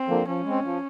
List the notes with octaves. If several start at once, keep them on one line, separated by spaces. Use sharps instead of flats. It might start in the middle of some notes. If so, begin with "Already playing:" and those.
Already playing: C4
D3 F3 A#3
F3 C#4
G#3 C4
F3